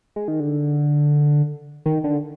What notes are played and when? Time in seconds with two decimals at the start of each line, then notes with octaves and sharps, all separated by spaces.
0.16 G#3
0.28 D#3
0.40 D3
1.86 D#3
2.04 D3